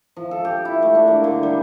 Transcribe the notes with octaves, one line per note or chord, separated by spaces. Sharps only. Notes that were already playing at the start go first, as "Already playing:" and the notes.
F3
A4
G4
E4
A3
D4
A#3
D3
G3